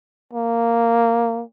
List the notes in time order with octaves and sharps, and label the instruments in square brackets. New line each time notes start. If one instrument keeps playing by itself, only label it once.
[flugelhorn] A#3